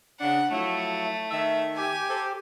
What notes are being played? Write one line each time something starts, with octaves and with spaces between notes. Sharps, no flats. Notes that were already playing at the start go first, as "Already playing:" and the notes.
C#3 D4 F#5
F3 F#3 A3 E4
D#3 E5
G4 G#5
A4 C5